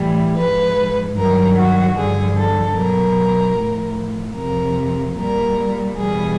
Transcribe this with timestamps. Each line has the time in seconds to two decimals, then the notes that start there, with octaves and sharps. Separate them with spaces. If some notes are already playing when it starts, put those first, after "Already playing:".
Already playing: A2 E3 G3
0.37 G#2 F3 B4
1.17 G2 D#3 F#3 A#4
1.57 F#4
1.97 G2 D3 F3 G#4
2.37 A4
2.77 B2 F#3 A#4
3.57 A2 F3
4.36 F2 C3 F3 A#4
5.17 A#2 G3 A#4
5.97 E2 B2 G3 G#4